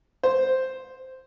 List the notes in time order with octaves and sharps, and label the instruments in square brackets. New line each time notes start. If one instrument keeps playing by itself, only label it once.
[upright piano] C5